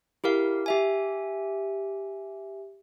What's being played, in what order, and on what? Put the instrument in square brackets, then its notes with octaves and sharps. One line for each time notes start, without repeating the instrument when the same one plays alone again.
[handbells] E4 G4 A#4 F5
G4 E5 G#5